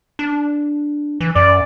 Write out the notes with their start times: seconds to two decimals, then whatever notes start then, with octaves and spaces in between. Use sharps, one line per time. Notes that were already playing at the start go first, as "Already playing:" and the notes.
0.19 D4
1.21 E3
1.36 F#2 D5